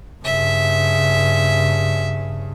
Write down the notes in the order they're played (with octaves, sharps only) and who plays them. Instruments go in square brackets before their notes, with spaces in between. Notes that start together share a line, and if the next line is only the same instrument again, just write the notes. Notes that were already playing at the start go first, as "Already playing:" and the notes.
[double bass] G2 C#3 [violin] E5